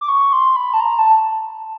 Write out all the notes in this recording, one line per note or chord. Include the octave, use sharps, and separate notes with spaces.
D6
C#6
C6
B5
A5
A#5
A5